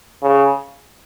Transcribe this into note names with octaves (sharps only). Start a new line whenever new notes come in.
C#3